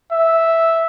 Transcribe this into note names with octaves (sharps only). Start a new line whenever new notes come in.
E5